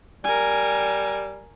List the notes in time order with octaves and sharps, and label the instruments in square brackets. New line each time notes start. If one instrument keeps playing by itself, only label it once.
[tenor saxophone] G3 [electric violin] A#4 G#5